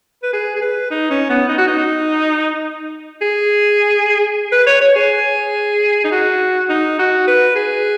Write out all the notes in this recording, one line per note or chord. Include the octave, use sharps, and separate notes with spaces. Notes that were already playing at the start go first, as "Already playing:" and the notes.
B4
G#4
G#4
B4
D#4
C#4
B3
D#4
F#4
D#4
G#4
B4
C#5
C#5
G#4
D#4
F#4
D#4
F#4
B4
G#4